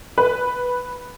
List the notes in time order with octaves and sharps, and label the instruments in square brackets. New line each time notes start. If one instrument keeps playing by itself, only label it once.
[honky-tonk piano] B4